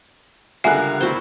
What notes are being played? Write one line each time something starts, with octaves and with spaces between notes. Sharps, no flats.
C#2 D3 G3 A#4 E5 F#5 G#5 F#6
F1 E4 F#4 C5